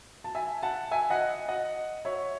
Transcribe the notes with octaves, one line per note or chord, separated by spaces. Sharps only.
A5
E5 G#5
F#5 A5
E5 G#5
D#5 F#5
D#5 F#5
C#5 E5